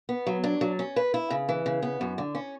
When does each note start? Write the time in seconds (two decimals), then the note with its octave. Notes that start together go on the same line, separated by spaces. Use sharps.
0.09 B3
0.27 F#3
0.44 D4
0.61 F#3
0.79 C#4
0.96 B4
1.14 E4
1.30 C#3
1.49 E3
1.66 C#3
1.82 B3
2.01 F#2
2.18 D3
2.35 C#4